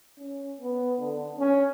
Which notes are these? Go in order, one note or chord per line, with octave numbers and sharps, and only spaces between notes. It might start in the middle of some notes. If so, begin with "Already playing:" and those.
C#4
B3
D3
C#4